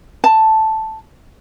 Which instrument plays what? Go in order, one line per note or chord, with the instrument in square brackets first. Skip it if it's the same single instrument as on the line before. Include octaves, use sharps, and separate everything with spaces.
[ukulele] A5